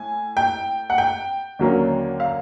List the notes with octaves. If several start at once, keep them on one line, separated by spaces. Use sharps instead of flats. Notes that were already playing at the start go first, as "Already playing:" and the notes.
Already playing: A2 G#5
G5
F#5
G5
D#2 D3 F#3 A#3 C#4
F5